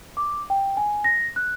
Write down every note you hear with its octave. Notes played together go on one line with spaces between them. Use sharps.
D6
G5
G#5
A#6
F#6